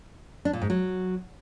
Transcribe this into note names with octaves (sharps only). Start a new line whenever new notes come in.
D4
A#2
G#2
F#3